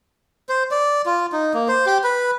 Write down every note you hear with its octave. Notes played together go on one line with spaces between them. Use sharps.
C5
D5
F4
D#4
A#3
C5
G4
B4